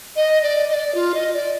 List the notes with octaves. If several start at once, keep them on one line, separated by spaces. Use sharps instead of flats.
D#5
D5
D#5
D5
F4
D#5
D5